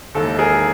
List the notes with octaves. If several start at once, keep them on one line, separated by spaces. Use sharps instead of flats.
E1 D#2 D#3 A4
G#4 A#4